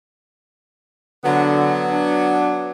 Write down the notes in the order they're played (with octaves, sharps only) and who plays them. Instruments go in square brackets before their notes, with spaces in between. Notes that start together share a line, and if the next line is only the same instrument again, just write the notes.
[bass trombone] D3 [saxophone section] F#3 B3
[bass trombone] D4